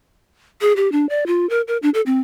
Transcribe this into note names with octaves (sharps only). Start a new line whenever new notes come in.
G#4
G4
D4
D5
F4
A#4
A#4
D4
A4
C4